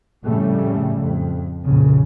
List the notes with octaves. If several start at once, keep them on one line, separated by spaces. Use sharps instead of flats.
F2 A2 C#3 G3 A3
F2
A#1 F2 C#3